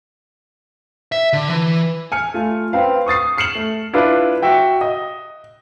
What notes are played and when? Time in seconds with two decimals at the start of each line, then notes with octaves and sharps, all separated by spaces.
1.12 E5
1.33 D3
1.50 E3
2.12 G#5 F6 C#7
2.34 A3 F4
2.73 C4 B4 F5
3.06 C#6 D#6 A6 C7
3.38 F6 C7 C#7 E7 F#7
3.55 A3
3.93 D4 E4 F4 B4
4.43 F#4 E5 G5
4.81 D#5